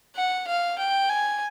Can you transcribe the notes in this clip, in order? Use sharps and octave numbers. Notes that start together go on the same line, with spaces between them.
F#5
F5
G5
G#5